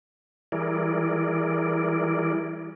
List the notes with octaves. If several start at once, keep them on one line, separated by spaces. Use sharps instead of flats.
E3 G3 E4 G#4 A#4 D5